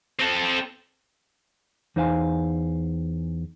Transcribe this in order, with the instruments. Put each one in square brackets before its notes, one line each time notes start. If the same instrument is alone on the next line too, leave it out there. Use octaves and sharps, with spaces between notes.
[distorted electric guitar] C4 A4
[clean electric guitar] E2 D#4 C5 F5 G#5